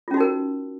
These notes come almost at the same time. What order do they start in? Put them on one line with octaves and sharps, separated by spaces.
F4 C#4 F#4 D#4 A#4